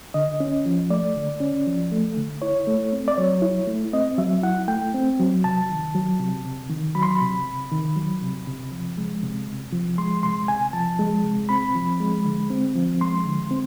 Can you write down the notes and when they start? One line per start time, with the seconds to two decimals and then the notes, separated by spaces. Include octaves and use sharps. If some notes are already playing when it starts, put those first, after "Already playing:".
0.14 D3 D#5
0.40 C#4
0.66 F3
0.90 A3 D5
1.16 D3
1.40 C#4
1.67 F3
1.92 A3
2.17 D3
2.42 E4 C#5
2.67 A3
2.93 C4
3.08 D5
3.17 F#3 C#5
3.42 E4
3.67 A3
3.93 C4 D#5
4.18 F#3 E5
4.43 E4 F#5
4.68 A3 G5
4.94 C4
5.19 F#3
5.44 C3 A5
5.69 D#3
5.94 F#3
6.20 C3
6.45 C3
6.70 D#3
6.95 F#3 B5
7.03 C6
7.11 B5
7.21 C3
7.45 C3
7.71 D#3
7.96 F#3
8.22 C3
8.47 C3
8.72 F3
8.97 G#3
9.23 C3
9.47 C3
9.73 F3
9.98 G#3 C6
10.23 C3 C6
10.48 C3 G#5
10.73 F3 A5
10.99 G#3
11.24 C3
11.49 C4 B5
11.75 F3
12.00 G#3
12.25 D3
12.50 C4
12.76 F3
13.01 G#3 C6
13.25 D3
13.51 C4